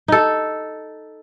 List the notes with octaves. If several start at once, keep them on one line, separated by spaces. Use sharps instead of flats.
D#4 A4